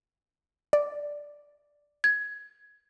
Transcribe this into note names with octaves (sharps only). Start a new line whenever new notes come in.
D5
G#6